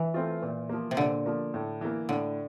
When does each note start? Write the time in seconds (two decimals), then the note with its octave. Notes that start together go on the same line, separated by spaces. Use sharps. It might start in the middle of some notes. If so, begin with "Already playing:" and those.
Already playing: E3
0.14 A3 C4 F4
0.42 A#2
0.69 F3 A#3
0.91 C3
0.97 A#2 D3
1.26 F3 A#3
1.54 A2
1.81 E3 A#3
2.09 A2 D3